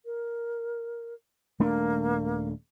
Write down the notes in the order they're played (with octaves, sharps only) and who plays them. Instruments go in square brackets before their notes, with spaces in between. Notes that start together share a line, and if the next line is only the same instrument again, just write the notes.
[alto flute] A#4
[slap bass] D#1 A3 D4 [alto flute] A#3